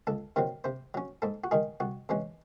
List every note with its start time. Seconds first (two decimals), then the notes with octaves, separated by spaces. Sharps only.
0.07 C#2 A4
0.36 C3 D#3 F#3 C4
0.64 C3 C5
0.94 F#3 C#4
1.22 G#2 A4
1.44 F#4
1.51 D#3 G#3 D#4 G#4
1.80 C2 F#4
2.09 C3 E3 G#3 C#4